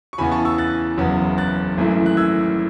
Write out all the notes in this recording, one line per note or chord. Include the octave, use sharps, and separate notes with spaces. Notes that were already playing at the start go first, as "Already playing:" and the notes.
C#6
E2 C#3 E3 B3 G#5 B5
A5 C#6
C#6 E6
F#6 A6
F#1 E2 C#3 F#3 B3
F#6 A6
G#1 F#2 E3 A3 E4
F#6
E6 G#6